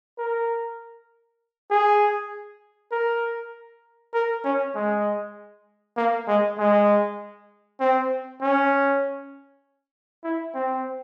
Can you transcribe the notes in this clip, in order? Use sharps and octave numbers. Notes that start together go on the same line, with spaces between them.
A#4
G#4
A#4
A#4
C#4
G#3
A#3
G#3
G#3
C4
C#4
E4
C4